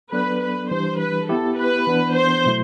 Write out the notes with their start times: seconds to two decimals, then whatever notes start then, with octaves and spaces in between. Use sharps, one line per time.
0.12 F#3 B3 D4 A4 B4 D5
0.41 B4
0.71 E3 G3 D4 G4 C5
0.99 B4
1.29 B3 E4 G4 A4
1.59 B4
1.87 E3 B3 D4
2.16 C5
2.46 B2 F#3 A3 E4